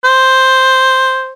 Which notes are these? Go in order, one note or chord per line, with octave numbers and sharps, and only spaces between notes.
C5